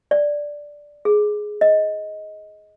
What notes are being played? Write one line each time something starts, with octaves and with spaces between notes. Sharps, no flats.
D5
G#4
D#5